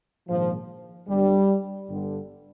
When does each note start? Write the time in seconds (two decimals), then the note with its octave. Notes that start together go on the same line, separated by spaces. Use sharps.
0.27 A#1 G#2 D#3 F3
1.08 G1 G2 D3 G3
1.89 G1 G2 D3